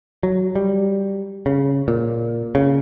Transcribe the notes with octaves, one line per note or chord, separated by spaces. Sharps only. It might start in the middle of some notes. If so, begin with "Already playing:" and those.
F#3
G3
C#3
A#2
C#3